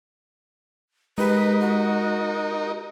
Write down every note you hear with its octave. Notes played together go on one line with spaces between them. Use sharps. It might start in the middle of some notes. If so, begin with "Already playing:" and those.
G#3 D#4 G4 A#4 B4
F#4